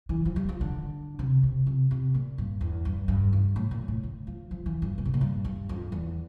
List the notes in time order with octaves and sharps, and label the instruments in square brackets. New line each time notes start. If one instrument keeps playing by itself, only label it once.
[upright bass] E3
F3
G3
F3
D3
C3
C3
C3
C3
A#2
G2
E2
G2
G2
G2
A2
A#2
A2
D3
F3
F3
E3
G2
A#2
C3
A#2
G2
G2
F2
E2